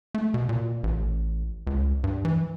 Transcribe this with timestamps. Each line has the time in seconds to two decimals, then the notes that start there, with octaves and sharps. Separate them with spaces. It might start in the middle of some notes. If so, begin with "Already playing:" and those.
0.14 A3
0.34 B2
0.49 A#2
0.83 A1
1.67 C#2
2.04 G2
2.25 E3